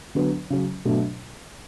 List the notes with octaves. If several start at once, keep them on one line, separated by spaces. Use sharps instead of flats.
D3 F#3 B3
C#3 F#3 C#4
B2 F#3 A3 D4